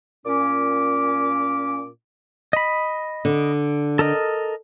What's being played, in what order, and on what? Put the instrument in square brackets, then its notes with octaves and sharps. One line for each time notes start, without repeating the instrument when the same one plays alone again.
[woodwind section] A#2 C#4 D6
[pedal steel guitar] D#5 B5
[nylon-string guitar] D3
[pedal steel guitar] A4 A#4 D#5